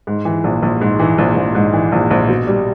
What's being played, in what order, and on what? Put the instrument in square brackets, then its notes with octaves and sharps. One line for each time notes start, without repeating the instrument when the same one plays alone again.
[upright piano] G#2
E3
A#1
A#1
G#2
E3
A#1
A#1
G#2
E3
A#1
A#1
B2
G3